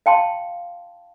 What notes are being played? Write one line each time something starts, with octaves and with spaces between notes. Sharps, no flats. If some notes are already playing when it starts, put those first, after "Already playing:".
F5 G5 A5 C6